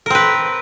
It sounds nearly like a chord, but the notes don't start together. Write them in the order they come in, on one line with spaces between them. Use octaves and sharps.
A#4 C4 B4